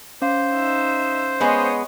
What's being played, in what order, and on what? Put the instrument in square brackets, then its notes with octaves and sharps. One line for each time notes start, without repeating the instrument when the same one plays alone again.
[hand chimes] C#4 F5 [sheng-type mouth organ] C5
[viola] D#4 E5
[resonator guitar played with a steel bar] G#3 B3 [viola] C#5 D#5